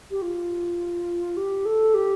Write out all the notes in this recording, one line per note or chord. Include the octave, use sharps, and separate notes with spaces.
G4
F4
G4
A4
G4